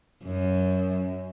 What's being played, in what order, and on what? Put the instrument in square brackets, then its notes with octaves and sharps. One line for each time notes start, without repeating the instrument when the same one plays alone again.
[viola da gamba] F#2